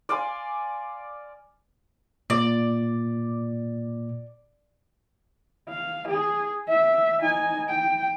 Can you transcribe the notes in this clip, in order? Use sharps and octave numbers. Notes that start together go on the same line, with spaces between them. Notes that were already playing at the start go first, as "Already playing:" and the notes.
D5 F5 G#5 C6
A#2 D5
F5
G#4
E5
D#4 G#5
G5